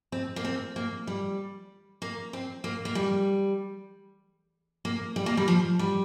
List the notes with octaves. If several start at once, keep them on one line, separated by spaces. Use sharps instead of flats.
C4
A#3
C4
A#3
G3
A#3
C4
A#3
A#3
G3
A#3
G3
A#3
G3
F3
G3